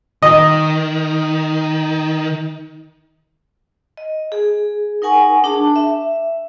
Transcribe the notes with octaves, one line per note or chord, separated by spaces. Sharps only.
D#3 D#5
D#5
G#4
D#4 A#4 F#5 G#5 C#6
D4 G#4 A5
E5